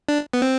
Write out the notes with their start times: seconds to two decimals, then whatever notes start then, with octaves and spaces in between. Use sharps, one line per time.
0.09 D4
0.33 B3
0.42 C4